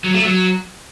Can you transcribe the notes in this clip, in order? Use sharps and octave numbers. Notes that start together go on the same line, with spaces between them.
F#3
A3
F#3